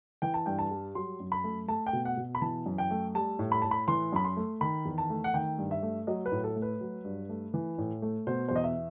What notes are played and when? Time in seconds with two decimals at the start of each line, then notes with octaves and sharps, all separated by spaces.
0.22 E3 G5
0.34 A5
0.46 G2 G5
0.59 A5
0.71 G3
0.95 F#3 C6
1.20 F#2
1.32 B5
1.44 A3
1.68 A3 A5
1.87 G5
1.93 B2
2.05 F#5
2.17 B2
2.35 B5
2.42 E3 A5
2.66 F#2
2.78 G5
2.91 A3
3.15 G3 A5
3.39 A2
3.52 B5
3.62 A2 A5
3.71 B5
3.88 E3 C6
4.12 F#2 B5
4.25 C6
4.37 A3
4.61 D#3 B5
4.85 E2
4.98 A5
5.10 A3
5.24 F#5
5.34 D#3 G5
5.58 G2
5.71 E5
5.83 A3
6.07 F#3 D#5
6.26 B4
6.32 A2
6.44 A4
6.56 A3
6.62 B4
6.81 F#3
7.05 G2
7.29 A3
7.54 E3
7.78 A2
8.02 A3
8.27 B2 C5
8.48 C5
8.51 E2 D#5
8.64 E5